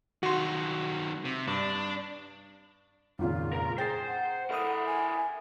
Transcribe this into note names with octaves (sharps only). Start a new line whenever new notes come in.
D#3 F#3 F#4 C6
C3
G2 D4
G#1 F2 A#2 C#3 F4
A#4 A#5
G#4 C5 G5 A#5 A6 C7
F#5
E4 A4 A#4 E5 D#6
G#5